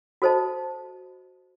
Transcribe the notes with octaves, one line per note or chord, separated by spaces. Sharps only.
F#4 A4 C5 D#5 A5